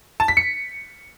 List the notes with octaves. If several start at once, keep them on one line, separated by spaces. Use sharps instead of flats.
A5
B6
C#7